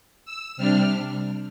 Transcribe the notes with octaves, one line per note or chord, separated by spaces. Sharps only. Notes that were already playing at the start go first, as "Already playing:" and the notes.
E6
C3 G3 D4 F6